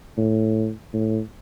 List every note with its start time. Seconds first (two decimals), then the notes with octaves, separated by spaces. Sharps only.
0.18 A2
0.93 A2